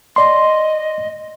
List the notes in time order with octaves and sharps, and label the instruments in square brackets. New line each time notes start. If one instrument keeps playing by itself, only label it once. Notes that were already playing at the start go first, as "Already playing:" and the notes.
[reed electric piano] D5 C6 [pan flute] D#5